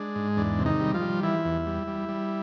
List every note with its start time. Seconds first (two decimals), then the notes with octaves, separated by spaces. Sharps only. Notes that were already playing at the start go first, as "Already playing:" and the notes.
Already playing: G#3 D4
0.15 G#2
0.37 E2 D4
0.59 C3
0.66 D#3 D#4
0.80 G3
0.94 F3 F4
1.01 G3
1.23 E3 E4
1.45 E2
1.67 G3
1.87 G3
2.09 G3